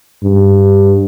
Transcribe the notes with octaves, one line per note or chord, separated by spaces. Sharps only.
G2